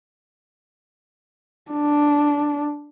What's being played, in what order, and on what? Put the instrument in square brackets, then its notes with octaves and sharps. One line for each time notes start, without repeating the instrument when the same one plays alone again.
[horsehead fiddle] D4